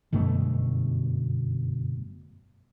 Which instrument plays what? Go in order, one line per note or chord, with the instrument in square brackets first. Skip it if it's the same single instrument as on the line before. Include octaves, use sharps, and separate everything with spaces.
[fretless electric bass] G1 F#2 B2 A3